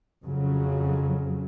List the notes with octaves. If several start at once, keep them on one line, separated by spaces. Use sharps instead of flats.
F2 C#3 F#3